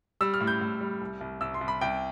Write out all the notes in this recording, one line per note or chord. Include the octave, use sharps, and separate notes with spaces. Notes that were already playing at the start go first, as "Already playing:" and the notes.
G3 E6
F6
A2
G6
A2
G3
C2
C2
C2 E6
C6
C2
B5
C2 G5